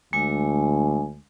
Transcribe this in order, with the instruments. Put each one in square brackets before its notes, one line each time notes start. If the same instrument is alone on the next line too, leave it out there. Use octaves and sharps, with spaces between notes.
[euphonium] D2 [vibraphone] G#3 D4 G#5